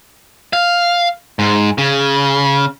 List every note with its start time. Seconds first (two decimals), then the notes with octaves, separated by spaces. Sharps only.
0.53 F5
1.39 G#2
1.78 C#3